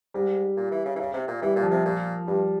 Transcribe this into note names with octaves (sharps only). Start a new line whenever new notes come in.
G#2 G3
A#2
E3
C#3
E3
C#3
C3
A#2
E3 G3
A#2
F3
C3
A#2
G2 G3